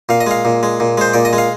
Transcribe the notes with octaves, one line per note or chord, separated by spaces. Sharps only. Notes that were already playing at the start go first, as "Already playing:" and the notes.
A#2 F5
D#5
G#3 F5
A#2
G#3
A#2
G#3 C5
A#2 D5
D#5
G#3
F5